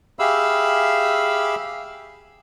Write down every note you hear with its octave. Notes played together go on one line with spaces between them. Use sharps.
G4 G#4 E5 F5 B5 E6